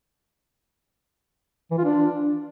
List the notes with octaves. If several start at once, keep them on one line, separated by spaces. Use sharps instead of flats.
E3
F4
D4